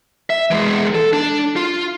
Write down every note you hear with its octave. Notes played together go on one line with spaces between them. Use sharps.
E5
E3 G#3
A4
D4
F4